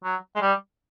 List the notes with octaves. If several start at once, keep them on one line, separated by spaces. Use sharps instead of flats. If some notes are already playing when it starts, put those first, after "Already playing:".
F#3
G#3
G3